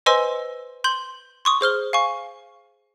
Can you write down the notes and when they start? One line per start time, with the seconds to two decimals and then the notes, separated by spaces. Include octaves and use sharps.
0.06 B4 C5 D#5 G#5 C6 E6
0.84 C6 G6 F#7
1.45 C6 C#6 D#6
1.61 G#4 C5 F6 G7
1.93 F5 G#5 C#6